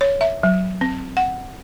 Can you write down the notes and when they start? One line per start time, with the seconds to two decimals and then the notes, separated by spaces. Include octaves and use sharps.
0.01 C#5
0.21 E5
0.43 F#3
0.81 C4
1.17 F#5